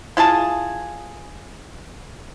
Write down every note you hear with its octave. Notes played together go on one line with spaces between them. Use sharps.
E4 F4 G#4 A5